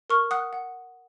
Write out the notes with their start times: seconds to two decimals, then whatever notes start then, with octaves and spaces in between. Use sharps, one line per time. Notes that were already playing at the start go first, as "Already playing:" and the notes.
0.10 A#4 C#6 F6
0.31 F#5 D#6 F#6
0.53 F#5